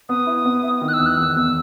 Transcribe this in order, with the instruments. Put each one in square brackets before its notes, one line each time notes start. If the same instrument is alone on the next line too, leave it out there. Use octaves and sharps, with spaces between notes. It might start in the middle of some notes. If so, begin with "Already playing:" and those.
[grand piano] B3 [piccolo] D#6
[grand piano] E4
B3
E4
D#3
[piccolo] F#6
E6
[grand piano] E2
[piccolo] F#6
[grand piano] E2 [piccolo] E6
[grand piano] E2 [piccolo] E6